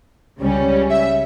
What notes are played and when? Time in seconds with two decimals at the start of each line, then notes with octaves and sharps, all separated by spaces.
0.41 C#2 C#3 G3 C#4
0.90 E5